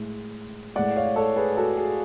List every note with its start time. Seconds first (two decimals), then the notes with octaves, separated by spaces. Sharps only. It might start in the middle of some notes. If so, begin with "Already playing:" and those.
Already playing: A2 G#3
0.76 A2 G#3 D5 F#5
0.96 C#5 F5
1.16 A4 C#5
1.36 G#4 B4
1.57 F#4 A4
1.77 G#4